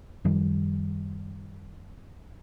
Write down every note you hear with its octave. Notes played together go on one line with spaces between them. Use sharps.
F#2 D#3 F3 G3